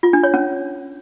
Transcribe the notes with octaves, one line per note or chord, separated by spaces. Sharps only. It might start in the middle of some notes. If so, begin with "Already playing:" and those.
F4
D4
C#5
C#4